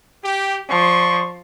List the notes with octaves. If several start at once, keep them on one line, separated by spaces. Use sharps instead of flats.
G4
F3 D5 C6 C#6